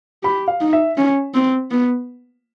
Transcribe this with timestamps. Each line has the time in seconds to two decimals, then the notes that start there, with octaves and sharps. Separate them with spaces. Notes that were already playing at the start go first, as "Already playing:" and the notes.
0.23 G4 B5
0.48 F5
0.61 D#4
0.73 E5
0.97 C#4
1.34 C4
1.71 B3